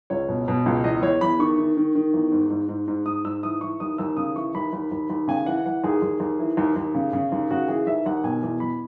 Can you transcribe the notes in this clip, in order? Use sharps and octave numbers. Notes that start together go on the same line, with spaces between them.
C#2 C#5
B2
B2
C#2
E2 D#5
E2 C#5
E2 B5
D#3 C#6
D#3
D#3
D#3
E2
G#2
G#2
G#2
G#2
G#2 D#6
G#2 E6
E3 D#6
E3 C#6
D#2 D#6
D#2 E6
C#3 D#6
E3 C#6
D#2 B5
D#2
D#2
D#2
C#3 G#5
E3 F#5
E3 F#5
D#2 G#4
D#2
D#2
E3
D#2
D#2
C#3
C#3
D#2
C#3 F#4
E3 G#4
D#2 E5
D#2 F#5
B2 G#5
E2
E2 B5